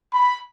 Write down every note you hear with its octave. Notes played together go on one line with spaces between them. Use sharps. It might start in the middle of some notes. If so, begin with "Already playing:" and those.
B5